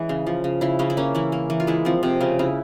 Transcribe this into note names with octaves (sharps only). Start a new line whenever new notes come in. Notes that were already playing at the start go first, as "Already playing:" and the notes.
Already playing: E3 G#3 C#4
C#3
F3
C#3
C#3 E4
C#3 C#4
E4
A#3 C#4
E3 E4
A#3
E3
F4
G#3 E4
F3 C4
C3 C4
C#3 C#4
C#3 E4